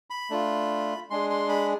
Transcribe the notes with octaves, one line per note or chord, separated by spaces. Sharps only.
B5
A3 D4 F4
G#3 D4 G#4 C6
C6
B5